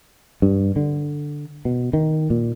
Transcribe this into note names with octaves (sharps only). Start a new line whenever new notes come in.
G2
D3
B2
D#3
A#2